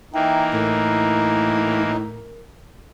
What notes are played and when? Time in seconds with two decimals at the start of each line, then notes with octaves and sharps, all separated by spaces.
0.14 E3 A#3 D#4 E5 G5 A#5
0.54 A2 A#4